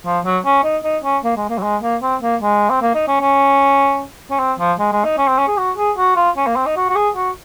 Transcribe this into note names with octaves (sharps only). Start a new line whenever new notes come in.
F3
F#3
C#4
D#4
D#4
C#4
A#3
G#3
A#3
F#3
G#3
A#3
C4
A#3
G#3
C4
A#3
D#4
C#4
C#4
C#4
C4
F3
G#3
G#3
D#4
C#4
C4
C#4
G#4
F#4
G#4
F#4
F4
C#4
A#3
C4
D#4
F#4
F#4
G#4
F#4